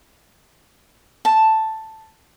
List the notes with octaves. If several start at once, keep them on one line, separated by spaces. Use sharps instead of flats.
A5